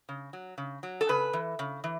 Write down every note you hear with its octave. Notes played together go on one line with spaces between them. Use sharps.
C#3
F#3
C#3
F#3
A4
C#3 B4
E3
C#3
E3